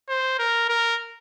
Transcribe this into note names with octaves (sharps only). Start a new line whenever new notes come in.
C5
A#4
A#4